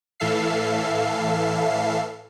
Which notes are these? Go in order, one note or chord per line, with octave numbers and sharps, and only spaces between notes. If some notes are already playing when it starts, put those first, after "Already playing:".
A2 E3 A4 E5 F5 C7